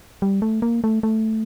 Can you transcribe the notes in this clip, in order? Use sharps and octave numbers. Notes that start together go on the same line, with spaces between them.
G3
A3
A#3
A3
A3